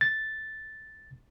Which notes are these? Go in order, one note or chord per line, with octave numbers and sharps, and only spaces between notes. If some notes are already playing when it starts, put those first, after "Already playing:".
A6